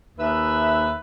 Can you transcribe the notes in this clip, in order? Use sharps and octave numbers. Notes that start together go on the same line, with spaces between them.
D#2 B4 E5